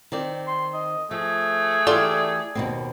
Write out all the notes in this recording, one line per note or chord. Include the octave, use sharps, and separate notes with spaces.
D#3 C4 D5
C6
D#5
F3 A3 G#4
E3 F4 G4 A4 D5
D#2 B2 C4